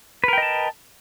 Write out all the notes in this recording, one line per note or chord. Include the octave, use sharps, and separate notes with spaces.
A#4 B4 D#5 G5 A5